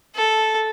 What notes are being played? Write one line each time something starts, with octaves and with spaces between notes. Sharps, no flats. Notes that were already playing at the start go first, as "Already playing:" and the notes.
A4